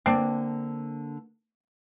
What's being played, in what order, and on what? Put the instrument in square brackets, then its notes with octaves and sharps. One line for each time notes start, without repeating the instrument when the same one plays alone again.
[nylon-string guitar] D3 A#3 [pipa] C4 D4